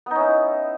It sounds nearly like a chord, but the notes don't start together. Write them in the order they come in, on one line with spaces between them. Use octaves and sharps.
B3 D#4 C#4 E4